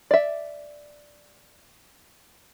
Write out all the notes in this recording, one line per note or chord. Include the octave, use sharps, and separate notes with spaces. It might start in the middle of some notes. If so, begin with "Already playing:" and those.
D5 E5